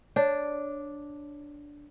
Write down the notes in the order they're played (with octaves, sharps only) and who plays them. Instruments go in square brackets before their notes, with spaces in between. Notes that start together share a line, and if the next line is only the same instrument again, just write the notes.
[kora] D4 [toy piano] C#5